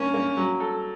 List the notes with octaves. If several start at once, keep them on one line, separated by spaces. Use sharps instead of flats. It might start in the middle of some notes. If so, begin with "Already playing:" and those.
Already playing: A#3 C#4 D4
A#3
F#3
A4